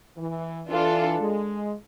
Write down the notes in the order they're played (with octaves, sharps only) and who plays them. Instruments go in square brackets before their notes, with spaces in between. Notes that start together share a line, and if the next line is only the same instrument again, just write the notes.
[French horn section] E3
[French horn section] E3 [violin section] D4 F4 A4
[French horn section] G#3